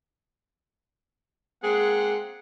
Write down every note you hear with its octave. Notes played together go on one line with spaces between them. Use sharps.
G#3 A#3 C4 G#4 F#5